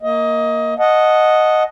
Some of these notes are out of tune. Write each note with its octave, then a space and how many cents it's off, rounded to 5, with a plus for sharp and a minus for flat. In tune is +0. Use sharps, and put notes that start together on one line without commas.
A#3 +0 D#5 +20
D#5 +0 F#5 -10 A5 -20